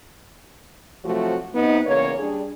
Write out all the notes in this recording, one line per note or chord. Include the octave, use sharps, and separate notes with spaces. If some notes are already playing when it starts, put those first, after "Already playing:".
C3 F3 F#3 A3 F#4
C3 B3 D#4
E2 C#3 A#3 C#5
G3 D4 G#4